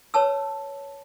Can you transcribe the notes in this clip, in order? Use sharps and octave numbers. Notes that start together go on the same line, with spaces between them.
B4 C#5 A5 E6